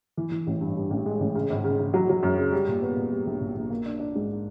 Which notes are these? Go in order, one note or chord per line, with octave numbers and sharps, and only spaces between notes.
E3
E3
A1
G2
G2
A1
G#3
A1
C#3
G#1
C#3
C#3
F#3
F#3
F#2
C#3
G3
A#2
B3
A#2
G3
A#1
A#2
A#1
A#3
D4
D4
G#2